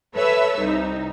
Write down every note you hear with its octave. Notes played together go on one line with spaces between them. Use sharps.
A4 B4 C#5 E5 E6
C2 D#4